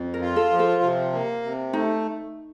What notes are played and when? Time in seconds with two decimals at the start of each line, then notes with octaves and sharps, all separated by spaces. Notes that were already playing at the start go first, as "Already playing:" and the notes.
Already playing: F2
0.14 A#4
0.21 F4
0.36 A4
0.51 F3
0.59 A4
0.82 C3
1.13 A#3
1.43 C3
1.73 A3 D#4